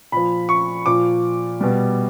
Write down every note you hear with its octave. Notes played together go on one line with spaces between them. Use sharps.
A#2 F3 B5
C#6
A#2 F3 D6
B2 G3